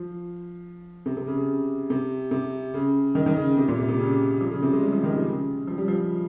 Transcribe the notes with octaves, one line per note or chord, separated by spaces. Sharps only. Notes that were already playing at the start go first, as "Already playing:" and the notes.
Already playing: F3
C3
C3
C#3
C#3
C3
C3
C#3
D#3
D#3
C#3
C3
A#2
C3
C3
C#3
F3
C#3
C3
G#3
G3
F3
D#3
C3
C#3
F3
G3
F3